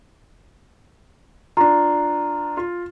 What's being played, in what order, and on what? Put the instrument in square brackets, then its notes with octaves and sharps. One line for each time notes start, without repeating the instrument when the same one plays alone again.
[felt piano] D4 F4 [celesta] A#5
[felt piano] F4